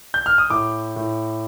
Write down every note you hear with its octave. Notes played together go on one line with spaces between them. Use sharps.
G6
F6
D#6
A2 D6
A2